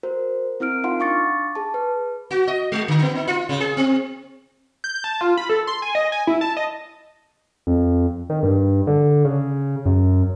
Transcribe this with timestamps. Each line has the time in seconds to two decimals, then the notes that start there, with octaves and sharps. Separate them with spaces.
0.03 F#4 A#4 C5
0.60 C4 E4 A#4 F6 D7
0.84 D#4 F4 F5 F#5 C6
1.00 D4 F5 C#6 D6 A6 C#7
1.55 G#4 A5
1.74 B4
2.31 F#4
2.47 D#5
2.72 G#3
2.88 D3
3.02 B3
3.15 D#4
3.27 F4
3.49 C#3
3.60 G#4
3.77 C4
4.84 G6
5.04 A5
5.21 F4
5.37 B5
5.49 A4
5.67 C6
5.82 G#5
5.95 D#5
6.12 G#5
6.27 E4
6.41 A5
6.57 D#5
7.67 F2
8.30 D#3
8.43 G2
8.87 D3
9.24 C#3
9.86 F#2